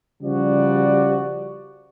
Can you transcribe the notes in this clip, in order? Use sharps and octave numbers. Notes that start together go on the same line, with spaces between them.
C#3 F3 G3 F#4 D5